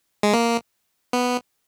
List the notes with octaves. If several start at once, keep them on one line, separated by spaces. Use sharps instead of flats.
G#3
A#3
B3